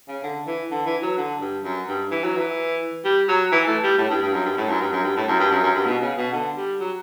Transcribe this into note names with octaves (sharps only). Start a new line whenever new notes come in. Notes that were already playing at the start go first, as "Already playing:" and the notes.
C#3
D3
E3
D3
E3
F#3
D3
G2
F#2
G2
E3
F#3
E3
G3
F#3
E3
A3
G3
A2
G2
G2
F#2
G2
A2
F#2
G2
F#2
G2
A2
F#2
G2
F#2
F#2
G2
B2
C#3
B2
D3
G3
F#3